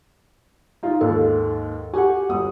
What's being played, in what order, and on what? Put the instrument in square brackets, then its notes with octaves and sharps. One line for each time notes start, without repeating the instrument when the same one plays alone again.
[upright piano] D#4 F4 F5
[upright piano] D#2 G#2 [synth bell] A4
[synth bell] F#4 G4 F#5 [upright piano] G#5
[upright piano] G1 D#6